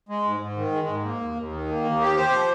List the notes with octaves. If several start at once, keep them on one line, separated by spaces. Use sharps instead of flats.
G#3
G#2
G#2
D#3
G#3
G#2
A#3
D#2
D#2
D#3
A#3
D#2
G4
C5
F3